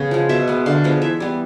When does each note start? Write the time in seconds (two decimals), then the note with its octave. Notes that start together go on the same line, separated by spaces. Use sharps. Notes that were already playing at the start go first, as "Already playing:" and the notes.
Already playing: C#3 B3
0.11 F3 G#3
0.29 B2 E5
0.48 G#3 B3
0.66 D3 F5
0.84 F3 G#3 B3
1.02 E3 E5
1.20 G3 B3